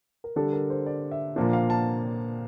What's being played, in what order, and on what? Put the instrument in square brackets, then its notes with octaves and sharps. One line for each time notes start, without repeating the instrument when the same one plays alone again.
[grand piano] A#4
D3 G3 D4 A4
A#4
C5
D5
E5
A#2 F3 A#3 D4
F5
A5